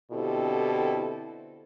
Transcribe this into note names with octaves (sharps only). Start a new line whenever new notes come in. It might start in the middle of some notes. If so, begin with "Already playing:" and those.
B2 D3 C4 E4 G4 A4